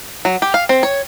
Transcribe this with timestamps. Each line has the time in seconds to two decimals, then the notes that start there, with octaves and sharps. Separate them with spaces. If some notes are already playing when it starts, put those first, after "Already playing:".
0.25 F#3
0.42 G4
0.54 F5
0.69 C4
0.83 C#5